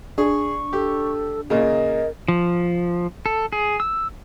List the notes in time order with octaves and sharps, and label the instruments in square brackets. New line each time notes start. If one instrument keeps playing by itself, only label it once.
[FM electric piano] D4 [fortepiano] G#4 [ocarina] C#6
[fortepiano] G4 [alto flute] A4
[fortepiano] A#2 C#3 [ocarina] A#4 [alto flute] D#5
[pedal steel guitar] F3
A4
G#4
E6